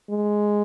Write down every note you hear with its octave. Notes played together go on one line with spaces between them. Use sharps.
G#3